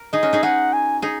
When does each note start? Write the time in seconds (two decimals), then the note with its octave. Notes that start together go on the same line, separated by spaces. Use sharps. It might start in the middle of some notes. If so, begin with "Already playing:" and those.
Already playing: A#4
0.13 D#4 G#4 D#5
0.23 C#4 F#4
0.33 D#4 G#4
0.43 D#4 G#4 F#5
0.73 G#5
1.02 D#4 G#4